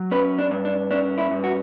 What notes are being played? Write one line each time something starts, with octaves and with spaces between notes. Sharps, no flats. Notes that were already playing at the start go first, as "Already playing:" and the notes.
Already playing: F#3
C#4 B4
D4
G2
D4
C#4 D4
E4
G2
F#4